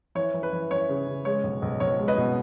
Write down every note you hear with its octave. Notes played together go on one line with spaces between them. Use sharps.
E3 C#5
E3
B4
E3
E3 C#5
C#3
C#3
G#3 C#5
B1
B1
B1 C#5
G#3
B4 D#5
B2